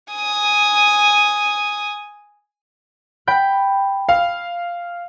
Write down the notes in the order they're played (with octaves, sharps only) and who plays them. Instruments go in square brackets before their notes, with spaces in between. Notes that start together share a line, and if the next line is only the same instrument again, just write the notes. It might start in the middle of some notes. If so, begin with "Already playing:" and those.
[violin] G#5 D#6
[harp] G5 B5 G6
[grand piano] F5